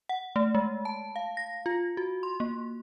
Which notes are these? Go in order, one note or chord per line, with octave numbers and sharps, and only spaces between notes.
F#5
A3
G#3
A5
F5
A#6
F4
F#4
C6
A#3